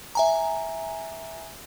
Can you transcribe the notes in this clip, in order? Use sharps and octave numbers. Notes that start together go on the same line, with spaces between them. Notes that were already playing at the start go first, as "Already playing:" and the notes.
E5 G#5 A#5